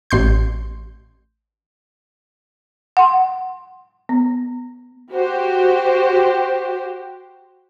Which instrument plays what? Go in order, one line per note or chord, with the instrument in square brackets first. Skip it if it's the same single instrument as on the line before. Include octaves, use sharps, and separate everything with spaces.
[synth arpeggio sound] A1 C6 G6
[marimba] F#5 C6
B3
[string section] F#4 G4 C5